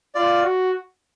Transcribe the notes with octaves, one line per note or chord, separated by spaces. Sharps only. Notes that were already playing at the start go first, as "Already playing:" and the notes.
F4 D5
F#4